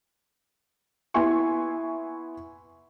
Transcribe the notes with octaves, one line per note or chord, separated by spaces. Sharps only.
B3 E4 E5 G#5 C6 C#6